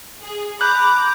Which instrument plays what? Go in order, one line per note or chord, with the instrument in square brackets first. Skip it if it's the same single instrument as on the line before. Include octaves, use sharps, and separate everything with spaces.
[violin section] G#4
[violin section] A#5 D6 [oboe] B5 [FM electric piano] F#6 [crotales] G6